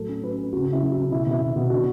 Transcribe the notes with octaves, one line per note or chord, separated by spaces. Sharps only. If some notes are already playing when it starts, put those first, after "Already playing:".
Already playing: A2 F#3 A4
C#4
F#3 B4
C#4
C#3 F#4
C#3
E4
F#3
F#4
C#3
B2 E4
B2 E4
B2
B2
D3 F#4